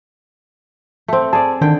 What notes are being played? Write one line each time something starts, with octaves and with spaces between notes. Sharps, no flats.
A3 C4
G#4 D5 A5
D3 D#3 G5